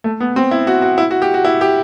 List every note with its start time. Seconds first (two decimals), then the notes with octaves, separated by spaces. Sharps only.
0.04 A3
0.20 B3
0.36 C4
0.51 E4
0.67 F#4
0.82 F#4
0.98 E4
1.11 F#4
1.22 G4
1.34 F#4
1.45 E4
1.61 G4